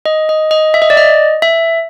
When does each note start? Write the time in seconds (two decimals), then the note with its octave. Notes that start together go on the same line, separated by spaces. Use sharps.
0.06 D#5
0.29 D#5
0.51 D#5
0.74 E5
0.82 D#5
0.90 D5
0.97 D#5
1.42 E5